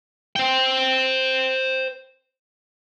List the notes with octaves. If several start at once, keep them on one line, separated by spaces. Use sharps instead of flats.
C5 G5